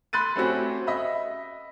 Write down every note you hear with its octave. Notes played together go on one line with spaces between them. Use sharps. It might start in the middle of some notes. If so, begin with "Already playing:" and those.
B5 C6 F#6 A6 D#7
A3 C4 C#4 F#4 G4
D#5 E5 B5